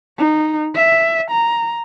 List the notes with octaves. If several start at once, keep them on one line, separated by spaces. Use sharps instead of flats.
D#4
E5
A#5